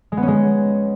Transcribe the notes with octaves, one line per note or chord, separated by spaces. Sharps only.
G#3
B3
C#4
G#3